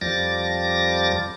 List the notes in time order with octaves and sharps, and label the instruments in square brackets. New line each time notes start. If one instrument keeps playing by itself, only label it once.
[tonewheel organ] F2 F3 G3 D6 A6 A#6